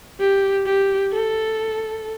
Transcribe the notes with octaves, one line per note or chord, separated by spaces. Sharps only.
G4
G4
A4